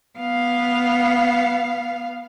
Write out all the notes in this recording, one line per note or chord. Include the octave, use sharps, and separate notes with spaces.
B3 F5